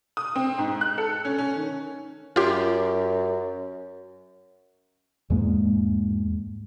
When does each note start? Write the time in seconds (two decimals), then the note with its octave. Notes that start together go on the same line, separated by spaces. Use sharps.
0.17 D#6
0.36 C4
0.58 G#2
0.81 F#6
0.98 A4
1.25 C#4
1.38 C#4
1.57 D#3
2.36 F#2 F4 G4
5.30 E2 G#2 G#3 A#3